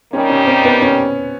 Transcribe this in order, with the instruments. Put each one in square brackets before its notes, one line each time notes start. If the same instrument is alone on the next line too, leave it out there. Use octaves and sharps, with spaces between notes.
[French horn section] D#3 G3 A#3 D#4 G4 [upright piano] C#4
[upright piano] C#4
C4
B3
C#4